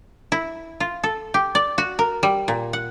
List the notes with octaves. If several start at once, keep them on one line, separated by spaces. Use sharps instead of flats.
E4
F4
A4
G4
D5
F#4
A#4
G3
A#2
F#5